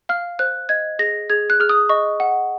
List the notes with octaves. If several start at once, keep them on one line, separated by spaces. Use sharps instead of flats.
F5 F6
C5 F#6
D#5 G#6
G#4 A#6
G#4 G#6
F#6
G#4 F6
D#6
D#5 C#6
F#5